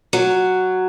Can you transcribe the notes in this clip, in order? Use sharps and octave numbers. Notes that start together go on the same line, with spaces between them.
F#3